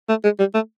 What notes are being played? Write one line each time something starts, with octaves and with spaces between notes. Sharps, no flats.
A3
G#3
G3
A3